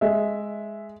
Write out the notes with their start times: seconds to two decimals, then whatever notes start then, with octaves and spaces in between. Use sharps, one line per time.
0.01 G#3 E5